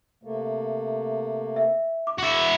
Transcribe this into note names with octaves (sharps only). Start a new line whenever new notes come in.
C3 A3 A#3
E5
D6
E4 F#4